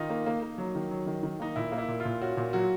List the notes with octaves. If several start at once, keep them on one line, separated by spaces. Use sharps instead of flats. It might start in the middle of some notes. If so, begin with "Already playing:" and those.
Already playing: D#3 D#4 F4
A#3
A#3
A#3
F#3
D#3
F#3
D#3
D#3
A#3 D#4
A#2 E4
A#3
E4
A#2
F4
A#2
C#4 F#4
A#2
F#3 F#4